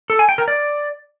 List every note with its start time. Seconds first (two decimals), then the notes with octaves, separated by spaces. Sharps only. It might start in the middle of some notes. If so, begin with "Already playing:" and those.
0.10 A4
0.19 G#5
0.29 G5
0.38 A#4
0.48 D5